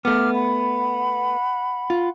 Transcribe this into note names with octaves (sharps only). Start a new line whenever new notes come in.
A3 B3 D6 F6
F#5 B5
F4